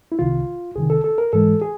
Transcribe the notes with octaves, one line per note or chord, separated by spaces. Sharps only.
E4
C2 C3 D#3 F4
C2 C3 D#3 G#4
A4
A4
A#4
G#2 E3 G#3 A4
G#4